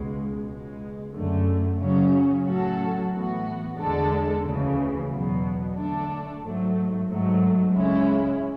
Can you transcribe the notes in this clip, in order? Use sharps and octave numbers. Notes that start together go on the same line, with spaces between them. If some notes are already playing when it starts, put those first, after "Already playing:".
Already playing: C#2 B2 G#3
C#2 B2 G#3
F#2 D3 A3
C#3 F#3 C#4
A2 F#3 C#4 F#4 A4
A2 E3 B3 F#4
E2 D3 G#3 D4 A4
D2 C#3 E3
E2 B2 F#3 B3
D3 A3 D4 A4
G#2 F#3 A3
G#2 F#3 A3
C#2 C#3 G#3 C#4 E4